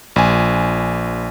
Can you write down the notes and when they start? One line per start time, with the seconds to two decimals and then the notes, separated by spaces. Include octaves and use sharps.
0.16 A#1 G#5